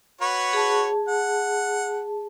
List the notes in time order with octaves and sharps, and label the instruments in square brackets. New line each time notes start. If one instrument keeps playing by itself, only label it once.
[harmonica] F#4 B4 C#5
[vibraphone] G#4 A5
[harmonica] F#5